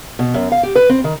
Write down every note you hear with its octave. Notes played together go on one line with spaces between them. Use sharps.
B2
F#2
F5
G4
B4
C4
D#3